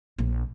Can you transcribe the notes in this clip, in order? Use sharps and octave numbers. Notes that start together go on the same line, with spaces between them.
A#1